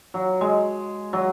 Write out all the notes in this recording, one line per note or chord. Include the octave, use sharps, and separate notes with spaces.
F#3
G#3
F#3